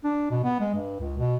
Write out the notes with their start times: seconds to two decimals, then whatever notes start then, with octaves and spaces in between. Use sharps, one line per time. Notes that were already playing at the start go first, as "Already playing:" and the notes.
0.04 D4
0.31 B2
0.44 B3
0.60 G#3
0.75 G2
0.99 C#2
1.18 B2